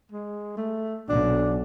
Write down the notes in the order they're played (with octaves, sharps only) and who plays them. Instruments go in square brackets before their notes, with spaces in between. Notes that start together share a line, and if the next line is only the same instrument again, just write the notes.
[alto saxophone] G#3
A3
[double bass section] B1 [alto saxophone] D4